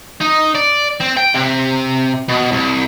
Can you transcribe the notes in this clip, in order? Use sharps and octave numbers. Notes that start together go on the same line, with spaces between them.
D#4
D5
C4
G5
C3
B2
C2